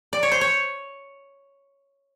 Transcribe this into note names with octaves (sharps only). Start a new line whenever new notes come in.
D5
C#5
C5
C#5